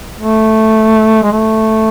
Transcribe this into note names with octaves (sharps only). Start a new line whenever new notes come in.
A3
G#3
A3